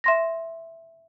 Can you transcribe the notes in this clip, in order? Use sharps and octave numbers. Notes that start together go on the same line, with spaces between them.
E5 C6 A#6